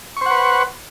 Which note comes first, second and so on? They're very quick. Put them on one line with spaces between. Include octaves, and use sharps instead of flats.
C#6 C5 F#5 B4